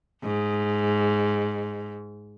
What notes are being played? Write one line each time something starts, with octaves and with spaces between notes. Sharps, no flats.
G#2